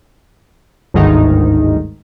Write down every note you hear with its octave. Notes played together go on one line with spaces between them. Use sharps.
G1 D2 G#2 D#3 D#4